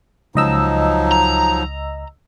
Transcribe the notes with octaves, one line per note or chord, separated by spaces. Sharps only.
C#2 F3 F#3 D#4 D#5 E6
A#5